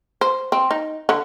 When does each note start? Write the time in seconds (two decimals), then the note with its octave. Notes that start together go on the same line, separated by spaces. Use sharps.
0.21 C5
0.52 C4
0.71 D#4
1.09 D3